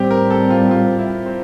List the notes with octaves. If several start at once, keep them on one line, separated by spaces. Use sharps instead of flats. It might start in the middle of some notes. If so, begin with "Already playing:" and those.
Already playing: A2 G3 C4 G4
A#4
A4
F4
F4
E4
C4